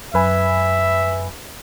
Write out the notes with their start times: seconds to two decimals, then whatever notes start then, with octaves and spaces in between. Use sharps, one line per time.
0.14 F#2 B4 E5 G#5